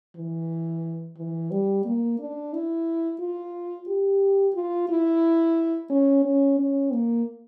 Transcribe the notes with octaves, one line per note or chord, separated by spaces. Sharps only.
E3
E3
G3
A#3
D4
E4
F4
G4
F4
E4
C#4
C#4
C#4
A#3